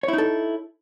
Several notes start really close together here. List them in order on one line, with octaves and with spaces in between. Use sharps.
C#5 E4 D#4 A4